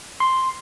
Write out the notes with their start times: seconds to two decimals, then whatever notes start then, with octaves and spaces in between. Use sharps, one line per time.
0.20 C6